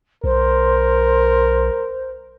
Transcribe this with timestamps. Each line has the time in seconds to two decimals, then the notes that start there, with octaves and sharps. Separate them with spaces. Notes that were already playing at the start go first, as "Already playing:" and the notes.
0.24 B1 A#4 C5